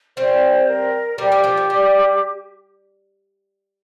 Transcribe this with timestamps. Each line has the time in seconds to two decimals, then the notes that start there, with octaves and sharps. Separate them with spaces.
0.17 G3 C4 C5
0.67 A#4
1.18 G3 C4 G4
1.32 F3 A#3
1.44 F3 A#3
1.57 F3
1.70 G3